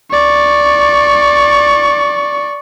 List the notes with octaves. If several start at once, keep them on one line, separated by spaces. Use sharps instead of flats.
D5 C#6